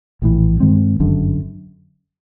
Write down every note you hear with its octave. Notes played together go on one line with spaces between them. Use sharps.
A#1 A2 E3
G2 D#3 G#3 C4
G1 F#2 D3